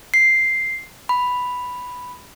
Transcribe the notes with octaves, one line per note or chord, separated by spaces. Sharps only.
C7
B5